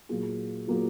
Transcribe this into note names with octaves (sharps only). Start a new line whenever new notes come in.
A#2 F#3 A#3 F4 G#4
A#2 F#3 A#3 F4 G#4